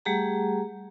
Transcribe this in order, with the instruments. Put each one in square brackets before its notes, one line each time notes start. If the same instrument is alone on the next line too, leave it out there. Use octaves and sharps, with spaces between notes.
[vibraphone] G3 A3 G4 G#4 F#5 A#5